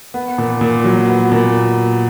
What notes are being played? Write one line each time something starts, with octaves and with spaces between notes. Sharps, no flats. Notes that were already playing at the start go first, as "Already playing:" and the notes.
B3
A#2
A#2
F#3
B3
A#2